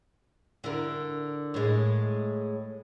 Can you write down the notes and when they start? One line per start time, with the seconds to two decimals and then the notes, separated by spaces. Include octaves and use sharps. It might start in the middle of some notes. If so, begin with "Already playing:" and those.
0.64 D3 E4 A#4
1.54 A2 G#3